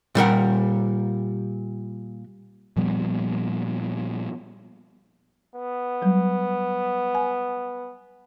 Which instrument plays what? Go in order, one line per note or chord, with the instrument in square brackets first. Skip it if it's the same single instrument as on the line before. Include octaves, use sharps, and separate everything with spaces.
[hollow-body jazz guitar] A#2 G3 A#4 F#5
[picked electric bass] A#2 F3 G3 B3
[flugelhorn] B3
[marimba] F#3 G3
G#5